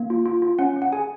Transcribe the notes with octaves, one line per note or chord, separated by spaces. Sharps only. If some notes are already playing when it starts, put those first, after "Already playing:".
Already playing: A#3
F4
F4
F4
C#4 F#5
C#4
F#5
G#4 G#5